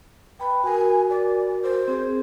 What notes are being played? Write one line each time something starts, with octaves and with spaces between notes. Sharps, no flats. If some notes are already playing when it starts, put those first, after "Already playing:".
B4 G5 B5
F#4 A#4 G#5
D5
C5
C4 G#4